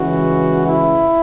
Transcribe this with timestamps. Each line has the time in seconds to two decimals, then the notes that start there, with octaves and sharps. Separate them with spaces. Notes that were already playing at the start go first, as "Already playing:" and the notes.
Already playing: C#2 C#3 E3 F#4
0.67 E4